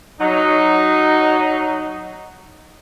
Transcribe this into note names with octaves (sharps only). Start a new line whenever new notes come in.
F#3 D#4